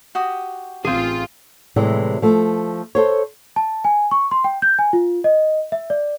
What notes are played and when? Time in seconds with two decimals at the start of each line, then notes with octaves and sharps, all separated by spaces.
0.15 F#4 G4 D#6
0.85 A1 C4 F4 G#4
1.76 A2 C3 E3 G3 G#3
2.22 F3 A3
2.95 A4 C5 C#5
3.56 A5
3.84 G#5
4.11 C#6
4.31 C6
4.44 G5
4.62 G6
4.79 G#5
4.93 F4
5.24 D#5
5.72 E5
5.90 D5